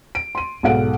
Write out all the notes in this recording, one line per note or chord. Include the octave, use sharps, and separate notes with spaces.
D7
C6 D#7
B1 G#2 A4 F5 F#5 D7